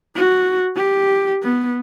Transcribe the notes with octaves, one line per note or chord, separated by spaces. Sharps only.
F#4
G4
B3